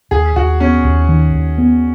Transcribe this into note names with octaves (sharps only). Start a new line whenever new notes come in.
D#2 G#4
D#2 F#4
B3 C#4
D#2
D#3
D#2
B3